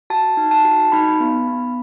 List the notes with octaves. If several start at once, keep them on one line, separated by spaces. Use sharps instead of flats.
F#4 A5
D#4
A5
F#4
D#4 B5
B3
B3